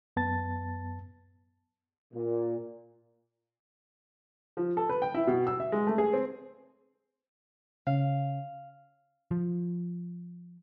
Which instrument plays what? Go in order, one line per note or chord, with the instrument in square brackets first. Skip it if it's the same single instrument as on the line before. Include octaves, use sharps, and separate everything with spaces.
[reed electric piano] F#2 B3 A5 A6
[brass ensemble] A#2
[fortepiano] F3
A4
B4
G5
E4
B2
E6
E5
G#3
A3
G#4
C4
[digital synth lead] C#3 [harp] F5
[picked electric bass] F3